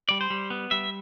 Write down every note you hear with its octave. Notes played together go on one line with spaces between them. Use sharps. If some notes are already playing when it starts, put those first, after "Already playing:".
G3 D5
C5
G3
B3
G3 E5